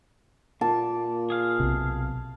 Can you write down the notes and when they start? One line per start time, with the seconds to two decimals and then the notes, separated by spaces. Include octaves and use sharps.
0.61 A#2 A#3 A5
1.30 G#4 F5
1.60 B1 C3